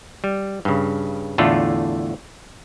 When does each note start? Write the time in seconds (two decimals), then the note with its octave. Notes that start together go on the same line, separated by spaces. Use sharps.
0.24 G3
0.65 G2 C#3
1.38 E2 A2 D3 A3 F4